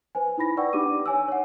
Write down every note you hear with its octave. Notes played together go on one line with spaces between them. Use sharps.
B4 C5 G#5
D#4 E4 B5 A#6
B4 D5 F#5 G5 C#6 E6
D4 D#4 G4 D6 D#7
C#5 G#5 E6
C#5 F#5